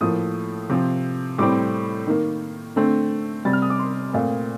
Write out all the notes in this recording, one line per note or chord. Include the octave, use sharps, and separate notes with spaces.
A2 F3 A#3 D#6
C3 F3 C4
A2 G3 C4 D6
D#3 A#3
D3 A3 C4
C3 G3 C4 A6
F6
D#6
D6
C6
A#2 A3 C4